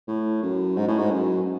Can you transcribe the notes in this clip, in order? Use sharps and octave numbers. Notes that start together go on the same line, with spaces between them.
A2
F#2
G#2
A2
G#2
F#2